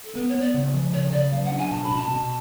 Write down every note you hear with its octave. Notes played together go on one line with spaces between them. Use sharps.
A4
B3 B4
C#5
B3
D5
C#3
F3
C#3 C#5
C#3 D5
F#3 F5
F#5
D4
G#5
B2 A5
B5
B2 A5
B2